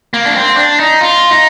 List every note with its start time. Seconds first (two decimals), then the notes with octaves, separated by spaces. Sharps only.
0.14 A#3
0.25 D4
0.36 C4
0.57 D4
0.80 D#4
1.01 F4
1.31 D#4